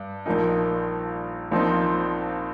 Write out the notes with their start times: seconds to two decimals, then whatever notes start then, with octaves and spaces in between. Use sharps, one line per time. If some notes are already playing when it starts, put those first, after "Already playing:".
Already playing: G2
0.26 A#1 A#2 F3 D#4 A#4
1.51 A#1 A#2 F3 C4 D#4